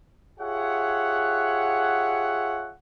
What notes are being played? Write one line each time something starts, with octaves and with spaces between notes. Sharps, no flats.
F4 G4 G#4 C#5 E5 F#5